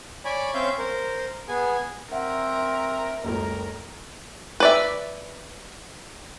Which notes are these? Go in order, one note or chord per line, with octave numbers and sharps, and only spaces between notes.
C#5 D5 G#5 B5 D6
C4 C#4 C#5 E5 F5 G6
A#4 C5
B3 G#4 G#5
C4 A#4 E5 F#5
F#1 C#2 A3 A#4
B4 D5 E5